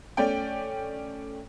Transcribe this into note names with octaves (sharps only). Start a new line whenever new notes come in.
A3 C#4 D5 G5